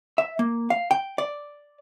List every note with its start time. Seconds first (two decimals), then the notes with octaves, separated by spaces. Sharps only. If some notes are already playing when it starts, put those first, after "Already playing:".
0.18 E5
0.39 A#3
0.70 F5
0.91 G5
1.18 D5